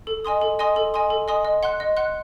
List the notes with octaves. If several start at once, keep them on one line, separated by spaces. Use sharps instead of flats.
A4
D#5 G#5 C6 D#6
A4
D#5 G#5 C6 D#6
A4
D#5 G#5 C6 D#6
A4
D#5 G#5 C6 D#6
D#5
F#5 C6 F#6
D#5
F#5 C6 F#6